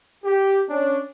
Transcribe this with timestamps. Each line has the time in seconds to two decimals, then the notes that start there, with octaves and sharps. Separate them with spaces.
0.24 G4
0.68 C#4 D4